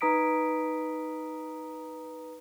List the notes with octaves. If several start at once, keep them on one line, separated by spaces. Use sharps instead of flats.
D#4 B4 A#5 D#6 B6 D7